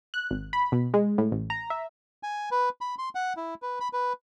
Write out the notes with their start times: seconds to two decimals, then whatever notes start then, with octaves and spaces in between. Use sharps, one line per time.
0.14 F#6
0.31 G#1
0.53 B5
0.72 B2
0.94 G#3
1.18 A2
1.32 A1
1.50 A#5
1.70 E5
2.23 G#5
2.51 B4
2.81 B5
2.98 C6
3.15 F#5
3.37 E4
3.62 B4
3.80 B5
3.93 B4